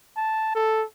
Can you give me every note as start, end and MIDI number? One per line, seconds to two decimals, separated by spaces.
0.16 0.52 81
0.55 0.84 69